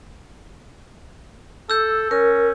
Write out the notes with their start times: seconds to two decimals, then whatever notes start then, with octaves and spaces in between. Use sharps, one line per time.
1.70 A4 E6 G6
2.11 C#4 A#4